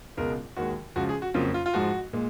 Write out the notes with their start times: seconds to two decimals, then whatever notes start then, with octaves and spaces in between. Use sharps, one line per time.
0.17 C#2 B2 G#3 A#4
0.57 D#2 D#3 G#3 F#4
0.96 C#2 C#3 F3 F#4
1.09 G#4
1.22 F#4
1.34 F2 C#3 F#3 A#3 F4
1.54 F4
1.66 F4
1.74 G#2 F3 G#3 F#4
2.13 A#2 G#3